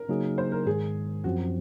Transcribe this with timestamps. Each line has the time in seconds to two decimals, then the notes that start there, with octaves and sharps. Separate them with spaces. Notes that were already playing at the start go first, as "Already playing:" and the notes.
Already playing: A#4
0.09 C#3 F#3 A#3 D#4 G#4
0.38 C5
0.52 A#4
0.66 G#2 D#3 G#3 G#4
1.24 F#2 F3 C4 F#4
1.39 F#4